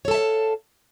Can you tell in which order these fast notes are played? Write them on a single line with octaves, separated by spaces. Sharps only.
C#5 A4 A5 E5 F5